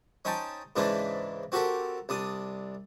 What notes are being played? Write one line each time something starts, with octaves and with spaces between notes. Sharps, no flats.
C#4 D#4 C5 G5 A5
G#2 C#3 E3 D4 E4 C5
C4 F#4 G4 A4 A#4
C2 D4 D#6